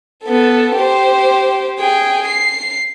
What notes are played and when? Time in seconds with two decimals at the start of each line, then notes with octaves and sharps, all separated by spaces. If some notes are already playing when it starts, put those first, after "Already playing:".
0.24 B3 A4
0.76 G4 C5
1.80 G#4 G5
2.28 C7